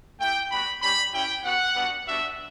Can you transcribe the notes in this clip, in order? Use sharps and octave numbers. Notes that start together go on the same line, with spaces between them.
A3 E4 G4 G5
G3 B3 F#4 B5
G3 C#4 G4 B5
C#4 E4 G4 G5
B3 F#4 F#5
G3 B3 D4 F#4
G3 B3 D4 F#4 E5